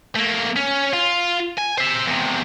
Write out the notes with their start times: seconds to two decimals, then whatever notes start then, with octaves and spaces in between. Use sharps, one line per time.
0.16 A3 A#3
0.56 C#4
0.93 F4
1.58 G#5
1.78 C5 E5
2.08 E2 C3